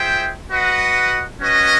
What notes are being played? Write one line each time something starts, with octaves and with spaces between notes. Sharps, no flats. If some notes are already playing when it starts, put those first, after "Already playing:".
Already playing: F4 G#4 C5 E5 G5
F#4 B4 D#5 F#5
C#4 F#4 B4 D#5